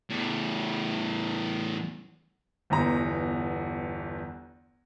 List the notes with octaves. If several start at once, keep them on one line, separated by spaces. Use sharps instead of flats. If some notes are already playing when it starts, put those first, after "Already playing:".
E2 A2
G1 E2 A#5